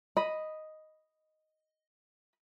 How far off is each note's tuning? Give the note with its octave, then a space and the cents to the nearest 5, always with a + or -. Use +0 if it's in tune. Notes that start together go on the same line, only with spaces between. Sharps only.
D#5 +0 B5 +0